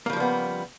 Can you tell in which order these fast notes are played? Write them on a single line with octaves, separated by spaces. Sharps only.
A#3 C#3 F3 G3 B3